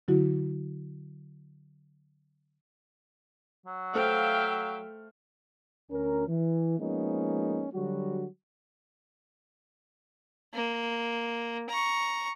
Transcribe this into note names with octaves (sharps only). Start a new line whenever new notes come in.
D3 F#3 E4 F#4
F#3
A3 C5 E5 F5 G5 F6
D2 C#4 A#4
E3
F3 G#3 A#3 B3 C#4 D#4
D3 F#3 G3 F#4
A#3
A#5 C#6